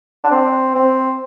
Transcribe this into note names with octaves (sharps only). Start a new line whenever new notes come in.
D4
C4
C4